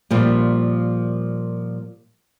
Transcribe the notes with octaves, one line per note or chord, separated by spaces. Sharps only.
A#2 F3 G3